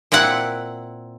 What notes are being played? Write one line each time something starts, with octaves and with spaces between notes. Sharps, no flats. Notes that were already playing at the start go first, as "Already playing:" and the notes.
A#2 C4 E4 F#5